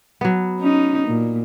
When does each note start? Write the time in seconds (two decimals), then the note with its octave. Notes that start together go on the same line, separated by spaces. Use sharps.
0.21 F#3 B3
0.60 C#4 D#4
1.08 A#2